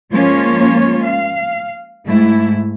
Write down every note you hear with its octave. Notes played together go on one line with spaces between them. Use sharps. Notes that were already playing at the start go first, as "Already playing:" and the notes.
F3 G#3 A#3 C#4 F4 C#5
F5
G#2 A3 E4